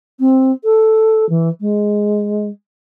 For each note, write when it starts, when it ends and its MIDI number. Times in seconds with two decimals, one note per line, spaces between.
0.19 0.51 60
0.64 1.28 69
1.29 1.49 52
1.60 2.49 56